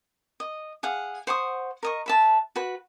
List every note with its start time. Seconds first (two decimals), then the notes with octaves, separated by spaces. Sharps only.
0.40 D#5
0.83 G#4 F5 F#5
1.27 C5 F#5 C#6 D#6
1.83 A#4 D#5 C#6
2.06 B4 E5 A5
2.56 F#4 B4